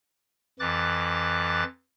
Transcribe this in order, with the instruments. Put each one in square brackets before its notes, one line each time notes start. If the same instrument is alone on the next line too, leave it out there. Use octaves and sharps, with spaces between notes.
[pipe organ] F2 E3 D6 F#6 A6